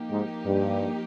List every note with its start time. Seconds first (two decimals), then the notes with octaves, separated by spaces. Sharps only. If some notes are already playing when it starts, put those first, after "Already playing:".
Already playing: F3 A#3 D#4 G4
0.11 G#2
0.46 G2